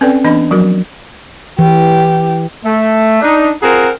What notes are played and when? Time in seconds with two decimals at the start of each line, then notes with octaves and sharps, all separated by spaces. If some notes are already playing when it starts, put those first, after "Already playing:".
0.01 C4 C#4 A4 B4 D5 G5
0.24 E3 B3 D4 D#5 B5
0.51 F3 F#3 F#4 A#4
1.59 E3 G4
2.65 A3
3.22 D4 D#4
3.62 C4 F4 G#4 A#4 F#5 A#5